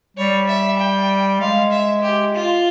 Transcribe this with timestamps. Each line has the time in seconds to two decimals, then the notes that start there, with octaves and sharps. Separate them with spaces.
0.17 G3 C#5
0.48 E5
0.79 G5
1.41 G#3 F5
1.71 E5
2.02 G4
2.34 F4